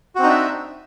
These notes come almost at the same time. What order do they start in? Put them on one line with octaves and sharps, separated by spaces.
F#4 C4 D#4 D4 E5